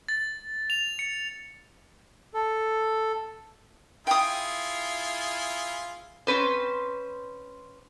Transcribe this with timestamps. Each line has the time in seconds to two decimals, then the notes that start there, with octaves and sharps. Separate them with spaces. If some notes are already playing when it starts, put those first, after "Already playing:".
0.08 A6
0.70 F7
0.99 C#7
2.34 A4
4.07 E4 F4 G#4 G5 D#6
6.27 C4 C#4 B4 C5